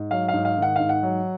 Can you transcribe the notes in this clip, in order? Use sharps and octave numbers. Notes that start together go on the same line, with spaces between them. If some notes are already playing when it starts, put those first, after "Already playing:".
Already playing: G#2
F#3 F5
G#2 F5
F5
D#3 F#5
G#2 F5
F#5
F#3